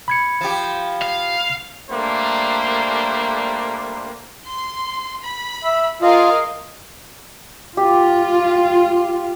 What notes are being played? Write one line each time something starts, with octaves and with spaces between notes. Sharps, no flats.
B5 G#6 C#7
F3 G4
F5
G3 A3 A#3 D4 C5
C6
B5
E5
F4 G#4 A#4 D#5 F5
F4 G4